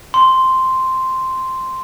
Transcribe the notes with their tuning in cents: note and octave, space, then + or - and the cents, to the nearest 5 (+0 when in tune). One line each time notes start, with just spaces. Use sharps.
C6 -5